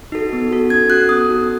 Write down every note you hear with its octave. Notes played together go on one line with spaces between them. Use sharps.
D#4 F#4 A4
B3
F#4 A4
C#4 G#6
F#4 A4 F#6
B3 D#6
D#4 F#4 A4